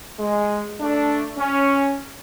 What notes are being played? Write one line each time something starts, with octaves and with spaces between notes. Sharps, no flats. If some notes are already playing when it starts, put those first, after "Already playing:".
G#3
A3 D4
C#4